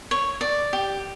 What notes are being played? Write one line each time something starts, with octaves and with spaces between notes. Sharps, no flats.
C#5
D5
G4